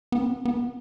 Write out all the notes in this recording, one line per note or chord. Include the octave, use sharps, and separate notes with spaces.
B3
C4
B3